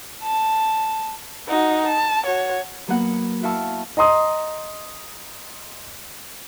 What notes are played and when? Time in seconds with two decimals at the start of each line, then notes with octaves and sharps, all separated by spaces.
0.22 A5
1.48 D#4 F#4
1.86 A5
2.26 F#4 C#5
2.88 F#3 A#3 B3 F#4 F#5
3.43 E4 F#4 F5 A5 C#6 E6
3.97 D#5 A#5 C6 D#6